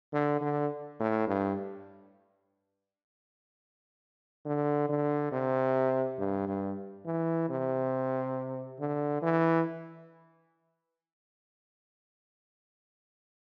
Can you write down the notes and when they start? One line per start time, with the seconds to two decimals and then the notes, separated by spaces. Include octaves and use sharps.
0.13 D3
0.41 D3
1.00 A2
1.28 G2
4.46 D3
4.89 D3
5.32 C3
6.19 G2
6.48 G2
7.06 E3
7.50 C3
8.80 D3
9.22 E3